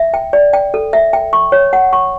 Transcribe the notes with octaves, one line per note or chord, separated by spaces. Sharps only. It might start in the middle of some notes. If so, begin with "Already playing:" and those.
Already playing: E5
G5
D5
G5
A4
E5
G5
C#6
C#5
F#5
C#6